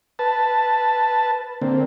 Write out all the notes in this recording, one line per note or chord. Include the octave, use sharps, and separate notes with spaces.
B4 A5
D3 A#3 C4